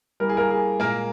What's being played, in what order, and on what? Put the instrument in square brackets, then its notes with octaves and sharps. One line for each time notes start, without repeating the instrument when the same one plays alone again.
[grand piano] E3 G3 A#3 A#4
G#4
A#3 A#4
G#4
A#2 G#3 A#3 A#4